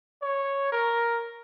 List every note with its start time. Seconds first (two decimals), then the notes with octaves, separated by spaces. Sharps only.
0.22 C#5
0.72 A#4